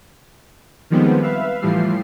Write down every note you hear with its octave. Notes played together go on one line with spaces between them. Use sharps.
D#3 F3 G3 G#3 B3 C4
B4 E5 F5
A2 E3 F3 G3 C7